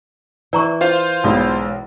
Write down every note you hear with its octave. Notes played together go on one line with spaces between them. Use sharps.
E3 D5 A#5 C#6
F4 C5 F5
B1 G#3 D5 B5